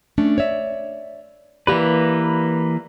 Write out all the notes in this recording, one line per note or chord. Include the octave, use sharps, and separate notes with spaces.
A3 C#4 D4
C#5 D5 E5
E3 A#3 G4 B4 D5